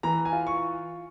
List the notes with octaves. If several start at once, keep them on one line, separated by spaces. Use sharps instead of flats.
E3 A#5
G#5
F4
C#6